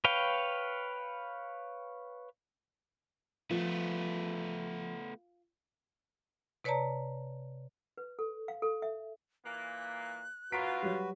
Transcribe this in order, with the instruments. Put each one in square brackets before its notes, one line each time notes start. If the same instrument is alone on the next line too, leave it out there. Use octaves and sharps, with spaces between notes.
[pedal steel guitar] B4 C#5 F5 G5
[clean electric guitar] F3 [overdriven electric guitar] A3 B3 [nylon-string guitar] F4
[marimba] C3 B4 C#5 D5 A5 A#5
[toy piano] B4
A4
F5
A4
E5
[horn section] A#2 E3 A#3 [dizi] F#6
[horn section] F#2 F4 [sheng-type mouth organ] F#4 B4 [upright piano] A#5 B6 D7
[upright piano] F#3 G3